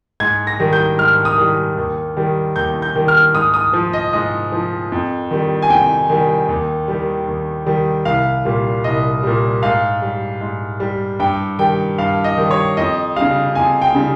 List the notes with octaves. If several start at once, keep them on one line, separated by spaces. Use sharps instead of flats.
G#2 G#6
A#6
D#3 G3
G6
G#2 F6
D#6
D#3 G3
D#2
D#3 G3
D#2 G6
G6
D#3 G3
F6
G#2 D#6
D#6
F3
D#5
G#2 D#5
F3
F2
D#3 G3
G#5
F2 G5
D#3 G3
D#2
D#3 G3
D#2
D#3 G3
C2 F5
A#2 G3
C2 D#5
A#2 G3
G#2 F5
G3
G#2
G3
G2 G5
D#3 G3 G5
G2 F5
D#5
D#3 G3
C#5
F2 D#5
C#3 G3 F5
F2 G#5
G5
C#3 G3